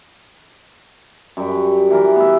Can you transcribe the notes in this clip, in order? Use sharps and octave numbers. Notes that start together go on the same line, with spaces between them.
F#2 G3
E3 A#4 D5
B3 E5